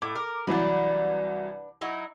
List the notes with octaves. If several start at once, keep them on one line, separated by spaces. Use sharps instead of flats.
A2 D6
A#4
C2 E3 F#3 D4 B4
F#3 D#4 E4